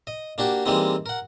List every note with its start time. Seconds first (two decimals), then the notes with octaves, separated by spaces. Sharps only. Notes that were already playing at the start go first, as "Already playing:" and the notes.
0.07 D#5
0.38 A#3 D4 F#4 G4
0.65 E3 G3 G#3 A#3 C4 D#4
1.06 A#4 F#5